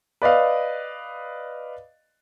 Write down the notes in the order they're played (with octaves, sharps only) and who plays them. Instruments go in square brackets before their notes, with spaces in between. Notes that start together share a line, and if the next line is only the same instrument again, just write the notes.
[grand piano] B4 D5 D#5 F5